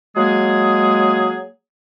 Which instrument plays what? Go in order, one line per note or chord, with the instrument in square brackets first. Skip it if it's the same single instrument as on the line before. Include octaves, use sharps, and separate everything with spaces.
[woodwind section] F#3 G#3 A#3 G#4